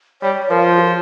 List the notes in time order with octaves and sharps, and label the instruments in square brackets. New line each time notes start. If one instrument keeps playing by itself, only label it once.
[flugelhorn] G3 [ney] C#5
[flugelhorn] F3 [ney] A#4
[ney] F4